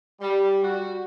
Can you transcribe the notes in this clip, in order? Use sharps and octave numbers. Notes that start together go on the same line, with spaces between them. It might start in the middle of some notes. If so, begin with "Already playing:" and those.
G3
F#4